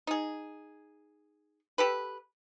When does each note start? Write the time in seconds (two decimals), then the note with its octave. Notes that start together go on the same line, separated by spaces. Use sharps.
0.07 D#4 G#4
1.78 G4 A4 B4